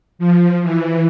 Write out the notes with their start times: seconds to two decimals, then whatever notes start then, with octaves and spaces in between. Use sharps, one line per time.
0.19 F3
0.62 E3